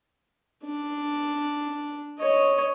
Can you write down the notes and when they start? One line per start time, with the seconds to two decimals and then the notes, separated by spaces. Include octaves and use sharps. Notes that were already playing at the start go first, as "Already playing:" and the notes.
0.65 D4
2.19 C#5 D#5